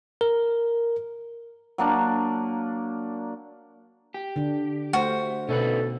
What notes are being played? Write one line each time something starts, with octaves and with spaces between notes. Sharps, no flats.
A#4
F#3 A#3 D4
G4
D3 D4
A3 F#4 C5
B2 C#4 D#4 A4 B4